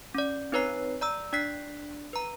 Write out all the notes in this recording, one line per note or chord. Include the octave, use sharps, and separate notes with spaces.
C#4 D5
C4 D#4 B4 C#5 A#5 C7
D5 A#5 E6
D4 D5 F#6 B6 C7
B4 A#5